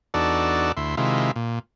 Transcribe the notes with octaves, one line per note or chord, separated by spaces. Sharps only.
E2 D4 D#4 F#4 A4 D5
D2 E4 C6
C3 D#3 G#3 E4 F4
A#2